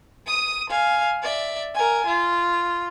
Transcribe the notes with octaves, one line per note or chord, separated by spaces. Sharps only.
D#6 D#7
F5 G#5
D5 E5
A#4 G#5
F4